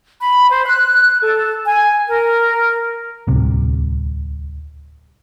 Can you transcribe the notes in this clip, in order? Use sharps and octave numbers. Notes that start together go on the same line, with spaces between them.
B5
C5
F#6
A4
G#5
A#4
D1 C2 C3